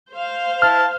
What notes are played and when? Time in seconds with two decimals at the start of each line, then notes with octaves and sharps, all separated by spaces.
0.13 C5 F5
0.62 E4 A5 F6